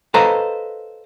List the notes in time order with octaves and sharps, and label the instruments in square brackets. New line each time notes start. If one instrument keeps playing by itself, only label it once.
[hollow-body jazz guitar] A4 B4 C5 D#5 F5 A#5